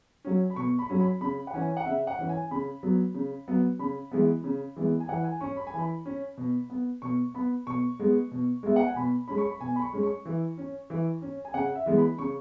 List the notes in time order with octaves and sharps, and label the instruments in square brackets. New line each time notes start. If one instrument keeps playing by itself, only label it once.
[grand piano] F#3 C#4
B5
B2 C#6
B5
F#3 C#4
B5
C#3 B5
F#5
E3 C#4 G#5
F#5
C#3 E5
F#5
E3 C#4
G#5
C#3 B5
F#3 B3
C#3
F#3 B3
C#3 B5
E3 G#3 B3
C#3
E3 G#3 B3
G#5
E3 F#5
G#5
C#4 C#6
B5
G#5
E3 B5
C#4
B2
B3
B2 C#6
B3 B5
B2 C#6
G#3 B3
B2
G#3 B3 E5
F#5
G#5
B2 B5
G#3 C#4 B5
C#6
B5
B2 G#5
B5
C#6
G#3 C#4
C#6
E3
C#4
E3
C#4
G#5
C#3 F#5
E5
E3 G#3 B3
B5
C#3 C#6